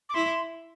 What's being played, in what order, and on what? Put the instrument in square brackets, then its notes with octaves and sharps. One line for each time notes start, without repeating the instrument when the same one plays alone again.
[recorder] D6
[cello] E4 [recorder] C6